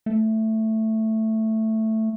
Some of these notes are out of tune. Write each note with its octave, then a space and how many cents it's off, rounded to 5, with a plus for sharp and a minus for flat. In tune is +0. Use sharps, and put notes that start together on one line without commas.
A3 +5